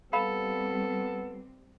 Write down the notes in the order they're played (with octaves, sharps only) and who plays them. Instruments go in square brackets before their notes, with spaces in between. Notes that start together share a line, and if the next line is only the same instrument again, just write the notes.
[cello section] G3 C4 [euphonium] B3 [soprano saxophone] A4 [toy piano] F5 B5